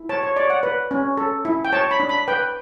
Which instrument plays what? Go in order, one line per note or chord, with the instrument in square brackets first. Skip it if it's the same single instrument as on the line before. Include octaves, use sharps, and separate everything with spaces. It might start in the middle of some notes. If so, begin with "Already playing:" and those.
Already playing: [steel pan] E4
C#5 A5
C#5
C#5 D5
F#5
B4
C#4
A4
E4
G5
C#5 A5
B5
D4
B5
B4 G5